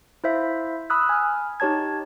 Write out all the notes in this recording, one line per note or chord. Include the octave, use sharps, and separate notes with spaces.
E4 C5 E5 F5
B5 D#6 E6 F#6
G#5 F6
D#4 G4 C#5 A5 G#6